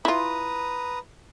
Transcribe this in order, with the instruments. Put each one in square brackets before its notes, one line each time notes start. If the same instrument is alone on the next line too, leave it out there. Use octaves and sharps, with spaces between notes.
[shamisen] E4 F4 [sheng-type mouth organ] B4 A#5 D#6